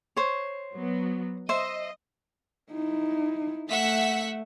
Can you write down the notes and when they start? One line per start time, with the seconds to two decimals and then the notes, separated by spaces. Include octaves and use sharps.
0.17 C5 C#5
0.74 F#3 B3
1.49 C5 D#5 E5
2.72 D#4 E4
3.71 A3 E5 F#5 B6